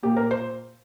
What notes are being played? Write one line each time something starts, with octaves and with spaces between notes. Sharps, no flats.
A#2 A#3 G4
A#4
C5